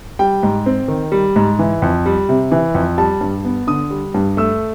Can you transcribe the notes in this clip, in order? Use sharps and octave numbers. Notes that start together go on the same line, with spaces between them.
G3 G5
G#2
C4
D#3
G3
G#2
E3
F2
G3
C3
E3
F2
G3 A5
G2
B3
D3 D#6
G3
G2
A3 E6